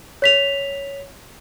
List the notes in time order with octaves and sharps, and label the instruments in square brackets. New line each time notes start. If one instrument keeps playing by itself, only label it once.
[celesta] C#5 B6 F7